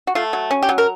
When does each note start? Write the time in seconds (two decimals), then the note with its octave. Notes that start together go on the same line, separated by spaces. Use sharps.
0.07 F#4
0.15 A3 F4
0.33 F#3
0.51 C#4
0.62 G4
0.69 F#3
0.78 A#4